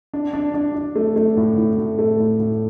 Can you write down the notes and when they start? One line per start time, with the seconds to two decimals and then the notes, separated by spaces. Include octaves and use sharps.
0.14 D4
0.34 D4
0.54 D4
0.75 D4
0.96 A3
1.16 A3
1.37 A2
1.58 A2
1.78 A2
1.99 A3
2.20 A2
2.40 A2